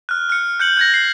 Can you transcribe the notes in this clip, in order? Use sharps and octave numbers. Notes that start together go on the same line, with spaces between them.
F6 F#6
F6 C#7
F#6 G6 C#7 F#7
F#6 G#6 A#6
C7